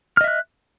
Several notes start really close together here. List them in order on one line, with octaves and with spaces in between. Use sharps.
F6 D#5 E5 F#6